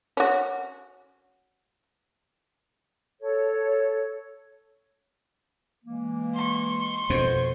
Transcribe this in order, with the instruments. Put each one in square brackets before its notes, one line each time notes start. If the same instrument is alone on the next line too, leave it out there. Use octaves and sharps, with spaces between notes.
[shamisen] C#4 F#4
[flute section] A4 C#5
[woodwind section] E3 G#3 A#3
[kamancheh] C6 C#6
[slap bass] F2 B2 [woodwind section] C5